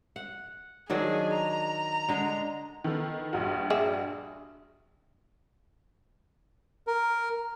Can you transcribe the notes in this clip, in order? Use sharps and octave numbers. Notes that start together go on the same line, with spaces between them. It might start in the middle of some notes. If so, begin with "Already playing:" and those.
F#5
D#3 F#3 D4 G#4
A#5
D3 G#3
D#3 B3 A4
A#1 G2 F#4
D4 G#4 E5
A#4